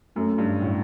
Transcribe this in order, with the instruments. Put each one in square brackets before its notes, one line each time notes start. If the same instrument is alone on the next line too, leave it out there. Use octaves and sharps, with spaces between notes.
[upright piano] F#2 [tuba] A3
[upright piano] G2
A2